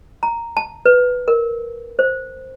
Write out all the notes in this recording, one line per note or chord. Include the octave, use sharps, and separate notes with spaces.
A#5
A5
B4
A#4
C5